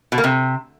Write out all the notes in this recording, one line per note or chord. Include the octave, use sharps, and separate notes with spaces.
B2
A#3
C3